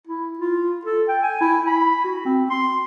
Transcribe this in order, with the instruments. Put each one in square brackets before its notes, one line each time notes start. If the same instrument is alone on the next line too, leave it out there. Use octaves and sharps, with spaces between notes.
[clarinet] E4
F4
A4
G5
G#5
E4
B5
F#4
C4
C6